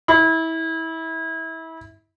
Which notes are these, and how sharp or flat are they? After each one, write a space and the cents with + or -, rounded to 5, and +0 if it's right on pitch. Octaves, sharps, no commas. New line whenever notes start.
E4 -25